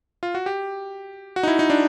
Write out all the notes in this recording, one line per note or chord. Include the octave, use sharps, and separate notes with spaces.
F4
F#4
G4
F#4
D#4
E4
D#4
D4